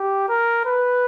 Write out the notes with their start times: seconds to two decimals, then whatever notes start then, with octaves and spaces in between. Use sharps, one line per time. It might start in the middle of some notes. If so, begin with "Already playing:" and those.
Already playing: G4
0.29 A#4
0.66 B4